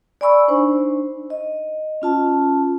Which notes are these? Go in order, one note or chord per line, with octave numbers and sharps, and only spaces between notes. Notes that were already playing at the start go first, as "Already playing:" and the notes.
D5 G#5 B5 C#6 E6
D4 D#4 C5
D#5
C#4 F4 A5